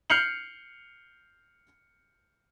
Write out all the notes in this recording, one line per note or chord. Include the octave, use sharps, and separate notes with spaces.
F6 G6 C7 C#7 F7 F#7